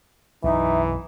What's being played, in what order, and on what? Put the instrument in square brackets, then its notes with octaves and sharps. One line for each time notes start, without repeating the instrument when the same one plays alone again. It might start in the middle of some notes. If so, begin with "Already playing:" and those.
[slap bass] B1 F#2 [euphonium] E3 [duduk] D#4 [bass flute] E5